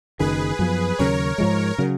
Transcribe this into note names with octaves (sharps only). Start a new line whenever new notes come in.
F#1 F#2 D#3 G#4 B4
F#2 F3 B3
D#2 C#3 F#3 C#4 A#4 C#5
G#2 F3 G#3
C#3 F#3